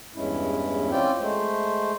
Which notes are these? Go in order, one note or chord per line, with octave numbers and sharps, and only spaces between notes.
E2 G2 G#3 C#4 E4
C4 C#4 F4 D5 G5
G#3 A3 C5